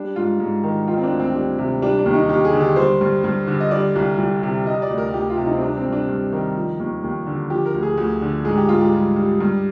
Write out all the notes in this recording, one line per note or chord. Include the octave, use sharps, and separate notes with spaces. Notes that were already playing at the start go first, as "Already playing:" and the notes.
Already playing: G3 D4
G#2 F4
G#2
D#3
D#3 F4
C4
D4
D2
C4
G3 D4
C3
G3 D4
D4
D#2
D#4
D#2 G4
G#4
D3
G4
G3 C5
G2
G2
D3
D#5
G3 D5
C2
C2
C3
G3 D#5
D5
D2
A#4
D2 G4
F4
C3
D#4
C4
G3 D4
C4
G2
D4
G2
D#3
F3
D#2
D#2
D3
F3 G4
A#4
D2
G#4
D2
D3
G#2 G#4
G4
G#2 F4
G4
G3
G3
G2